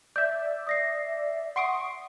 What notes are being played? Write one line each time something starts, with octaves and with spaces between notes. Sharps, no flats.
D5 E5 G6
D#6 A#6 C7
F#5 C6 C#6 D#6 C7 D7